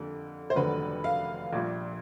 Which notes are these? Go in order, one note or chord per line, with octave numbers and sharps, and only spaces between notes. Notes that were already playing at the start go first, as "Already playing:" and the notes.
Already playing: F2 D3 G3 A#3
C5
F1 D#2 D3 F#3 B4
F5
A#1 A#2 G3